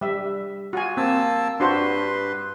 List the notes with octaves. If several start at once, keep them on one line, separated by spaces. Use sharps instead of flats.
G3 E5
F4 F#4 G#5
A#3 C4 A5 E6
G2 D4 F#4 B4 C5 C6